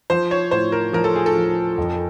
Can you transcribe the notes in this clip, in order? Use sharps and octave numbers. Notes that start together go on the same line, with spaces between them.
F3 C5
C#5
A2 C5
A#4
F3 A#4
A4
G#4
A4
F3
F2